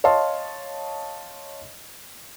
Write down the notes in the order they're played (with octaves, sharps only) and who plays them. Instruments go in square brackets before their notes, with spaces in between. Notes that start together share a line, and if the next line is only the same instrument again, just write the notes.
[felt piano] C#5 D#5 F5 A5 C6